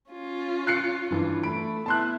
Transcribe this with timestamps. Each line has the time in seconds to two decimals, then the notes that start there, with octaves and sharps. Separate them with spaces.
0.11 C#4 F4
0.67 F#6 C7 C#7
1.11 G2 E3 F4
1.43 A3 B5 D7
1.86 B3 E4 A5 C6 F#6